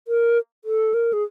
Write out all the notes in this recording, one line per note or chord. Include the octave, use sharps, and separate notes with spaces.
A#4
A4
A#4
G#4